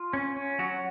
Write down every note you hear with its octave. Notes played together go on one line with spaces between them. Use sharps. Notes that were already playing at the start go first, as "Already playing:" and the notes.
Already playing: F4
C#4
C#4
F#3 F#4